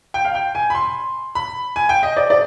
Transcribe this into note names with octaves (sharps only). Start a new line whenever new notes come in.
G5
F5
G5
G#5
B5
C6
B5
G#5
G5
D#5
D5
D5